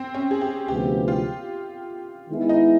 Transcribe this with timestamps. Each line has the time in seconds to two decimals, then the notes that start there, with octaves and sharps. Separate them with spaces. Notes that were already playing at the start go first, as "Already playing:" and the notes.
Already playing: C4
0.14 C#4
0.31 G#4
0.41 G4
0.68 D2 C3 F3 G#3 B3 G4
1.08 F4
2.29 D#3 G#3 B3 E4
2.49 D#4